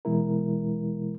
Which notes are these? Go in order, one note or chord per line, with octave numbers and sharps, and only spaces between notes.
B2 E3 G#3 E4 A#4